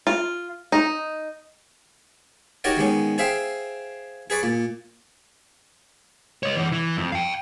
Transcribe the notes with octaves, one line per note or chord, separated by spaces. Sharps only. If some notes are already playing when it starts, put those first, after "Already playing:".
F4
D#4
D#4 F#4 G4 A#4 C#5 D5
D#3 G#3 B3 C#4
G#4 C5 E5 F5 G5
G#4 B4 D5 C#6
A#2
C#5 D#5
E3 D5
E3
F2
F5 G5